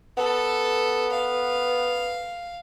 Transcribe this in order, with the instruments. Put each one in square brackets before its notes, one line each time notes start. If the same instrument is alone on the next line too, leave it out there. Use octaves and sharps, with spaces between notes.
[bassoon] B3 [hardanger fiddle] A4
[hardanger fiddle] F5